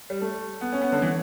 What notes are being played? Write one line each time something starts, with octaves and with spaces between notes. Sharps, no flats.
G3
A3
B3
C#4
B3
D3
E3